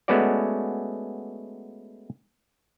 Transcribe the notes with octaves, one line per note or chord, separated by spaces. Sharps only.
G#3 A3 B3 C#4 F#4 D5